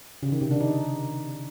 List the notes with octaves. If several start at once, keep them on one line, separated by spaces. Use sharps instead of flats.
C#3
D#3
C3
D4
D#4